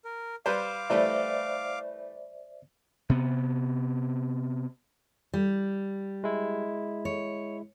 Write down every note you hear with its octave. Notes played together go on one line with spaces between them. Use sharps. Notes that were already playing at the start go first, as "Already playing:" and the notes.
A#4
G3 B4 C5 F5 D6
E3 G3 A3 C5 D5 E5
C3 B3
G3
G#3 E4
C#5